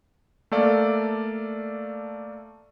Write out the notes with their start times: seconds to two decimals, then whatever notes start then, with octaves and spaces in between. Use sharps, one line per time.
0.52 A3 A#3 A4 D5 F5